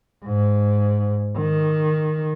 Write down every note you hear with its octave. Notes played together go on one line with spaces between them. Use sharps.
G#2
D#3